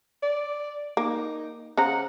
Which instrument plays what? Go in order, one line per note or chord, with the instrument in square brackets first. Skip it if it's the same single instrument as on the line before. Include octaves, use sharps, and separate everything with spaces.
[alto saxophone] D5
[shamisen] A#3 [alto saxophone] D#4
[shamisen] C#3 C5 A#5 [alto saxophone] F#5